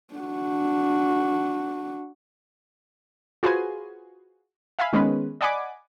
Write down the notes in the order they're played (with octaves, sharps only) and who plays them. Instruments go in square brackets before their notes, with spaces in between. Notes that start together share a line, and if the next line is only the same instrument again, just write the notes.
[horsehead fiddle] D4 F#4
[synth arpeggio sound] F4 F#4 G#4 B4 C5 G#5
E5 F5 G#5 B5
D#3 G#3 B3 C#4 B4
D5 D#5 F#5 G#5 B5 D6